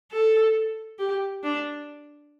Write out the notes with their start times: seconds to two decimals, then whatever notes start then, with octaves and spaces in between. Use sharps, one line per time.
0.12 A4
0.99 G4
1.43 D4